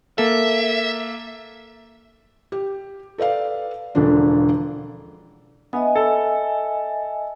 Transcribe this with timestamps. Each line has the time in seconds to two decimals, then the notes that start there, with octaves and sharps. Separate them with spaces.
0.18 A#3 A4 E5
2.52 G4
3.18 A4 B4 D5 F5
3.95 E1 A1 D3 F3 D4
5.73 B3 D#5 E5 G#5
5.95 A4